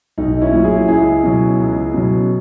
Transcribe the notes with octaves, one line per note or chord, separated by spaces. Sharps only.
B1 D#4
C#4 E4
A#2 F#3
E4 G#4
C#2 E4 G#4
B2 F#3
C#2
B2 F#3